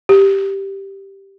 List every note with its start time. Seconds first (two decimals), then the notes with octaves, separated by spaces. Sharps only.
0.09 G4